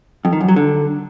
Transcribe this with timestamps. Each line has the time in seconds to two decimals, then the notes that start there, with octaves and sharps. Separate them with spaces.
0.25 F2
0.33 D#3
0.41 F#2
0.48 F#3
0.56 D3